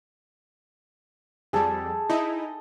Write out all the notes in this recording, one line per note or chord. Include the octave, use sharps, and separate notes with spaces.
F2 G3 G#4 A4
D#4 E4 D#5